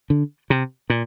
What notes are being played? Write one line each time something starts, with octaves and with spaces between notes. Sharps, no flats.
D3
C3
A#2